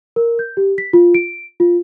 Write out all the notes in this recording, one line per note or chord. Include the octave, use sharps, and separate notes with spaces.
A#4
G6
G4
B6
F4
D7
F4